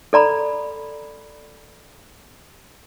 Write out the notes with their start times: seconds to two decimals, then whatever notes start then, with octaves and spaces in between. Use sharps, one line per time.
0.13 A4 D5 A#5 B5